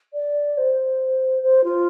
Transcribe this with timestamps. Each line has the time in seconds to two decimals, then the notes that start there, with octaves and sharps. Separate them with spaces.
0.13 D5
0.57 C5
1.42 C5
1.63 F4